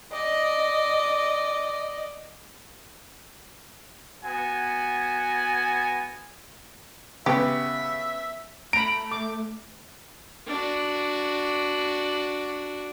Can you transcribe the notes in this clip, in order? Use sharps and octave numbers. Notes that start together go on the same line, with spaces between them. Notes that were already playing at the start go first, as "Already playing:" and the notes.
D5 D#5
B3 F#4 G#5
C#3 B3 G4 E5
A3 A#5 B5 D7
D6
D4 F#4